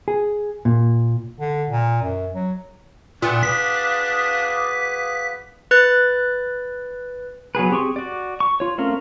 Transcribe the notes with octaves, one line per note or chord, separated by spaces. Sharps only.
G#4
A#2
D3
A#2
F#2
F#3
A#2 D#3 A3 B3 D4
F#4 G#4 B4 F5 D6 D#6 B6
B4 F#6 A6
F#3 B3 G#4 B4
C4 G4 G#4 C6 C#6
F#4 D5
C#6
F4 C#5
A3 C4 C#4 A#4 F5